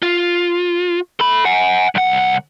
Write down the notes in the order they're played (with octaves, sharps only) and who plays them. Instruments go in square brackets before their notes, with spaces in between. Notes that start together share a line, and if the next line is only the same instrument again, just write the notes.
[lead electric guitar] F4
A4 B5
F#5 G#5
C2 F#5